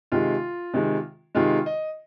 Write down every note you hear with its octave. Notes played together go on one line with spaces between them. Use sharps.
C3 D#3 G#3 F4
C3 D#3 G#3
C3 D#3 G#3 F4
D#5